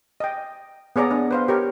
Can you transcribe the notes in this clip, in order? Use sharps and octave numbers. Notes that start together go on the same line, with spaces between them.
D#5 G5
B3 G#4 C#5 D5 A#5
B3 D4
B4 C5 F5
G4 A#4 C#5